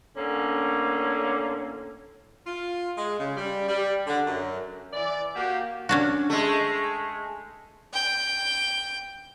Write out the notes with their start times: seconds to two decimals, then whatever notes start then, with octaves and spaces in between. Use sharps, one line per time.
0.17 A2 D3 A#3 C#4
2.47 F4
2.97 G#3
3.19 C#3
3.37 G3
3.68 G3
4.07 D3
4.27 F#2
4.93 E3 D5
5.35 A#3 F#4 G4
5.89 C#4 D4 F#4
6.30 G#3 A3
7.94 G5